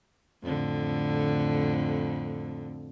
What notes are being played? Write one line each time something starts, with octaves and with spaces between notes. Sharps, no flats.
F2 A2 D3